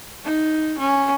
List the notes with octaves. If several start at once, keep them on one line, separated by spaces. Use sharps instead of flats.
D#4
C#4